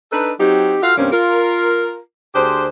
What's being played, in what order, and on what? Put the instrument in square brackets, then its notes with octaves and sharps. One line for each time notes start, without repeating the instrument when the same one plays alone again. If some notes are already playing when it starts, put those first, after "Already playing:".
[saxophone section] D4 D#4 A4 B4
F#3 C4 D#4 G4
F4 F#4 A4 F5
G2 C3 G3 A#3 C4 C#4
F4 A#4
D2 D4 G4 G#4 C5